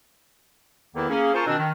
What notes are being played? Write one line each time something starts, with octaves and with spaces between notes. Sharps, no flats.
E2 D#3 A#3 E4 A4 B4
A#3 C#4 G#4
F4 A#4 C5 G#5 A5 C#6
B2 D#3 C4 D4
D#3